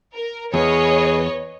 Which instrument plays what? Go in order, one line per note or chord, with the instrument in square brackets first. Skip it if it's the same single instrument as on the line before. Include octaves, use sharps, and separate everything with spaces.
[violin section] A#4
[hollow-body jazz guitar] E2 [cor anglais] G#4 [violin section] B4 C#5 D#5